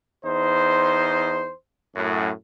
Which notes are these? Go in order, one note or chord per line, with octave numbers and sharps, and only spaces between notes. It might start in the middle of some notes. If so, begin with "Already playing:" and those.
E2 D#4 C5
F#2 A2